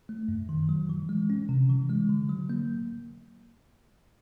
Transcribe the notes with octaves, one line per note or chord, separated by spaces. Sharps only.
A3
F#2
D#3
F#3
E3
G#3
C#4
C3
E3
G#3
D3
F#3
A#3